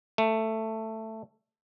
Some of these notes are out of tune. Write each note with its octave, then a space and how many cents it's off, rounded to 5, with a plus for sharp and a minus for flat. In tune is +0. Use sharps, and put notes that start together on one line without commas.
A3 +10